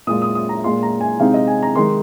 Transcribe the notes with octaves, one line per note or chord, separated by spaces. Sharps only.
A#2 G#3 F4 D#6
D#6
D#6
A#5
A#2 G#3 F4 C6
A#5
G#5
C3 G#3 C4 D#4 F5
D#5
G#5
A#5
D#3 G#3 D#4 C6